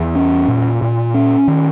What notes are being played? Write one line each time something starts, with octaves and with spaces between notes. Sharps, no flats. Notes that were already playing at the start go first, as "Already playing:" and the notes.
Already playing: E2
C#4
A#2
A#2
C#4
D#3